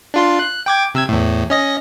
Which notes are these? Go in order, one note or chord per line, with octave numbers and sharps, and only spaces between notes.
D4 F4 C6
F#6
G5 D6 G#6
C3 E6 G#6
E2 A2
C#4 D#5 A#6